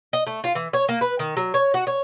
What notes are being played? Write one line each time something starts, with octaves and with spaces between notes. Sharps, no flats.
D#5
A3
F4
E3
C#5
A#3
B4
D#3
F#3
C#5
F#4
C#5